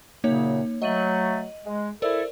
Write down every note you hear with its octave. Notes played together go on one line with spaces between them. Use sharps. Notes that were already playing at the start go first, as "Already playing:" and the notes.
F#2 A#2 C#3 A#3 D#4 C#5
F#3 A3 D#5 D#7 F#7
G#3
E4 A4 A#4 C5 D5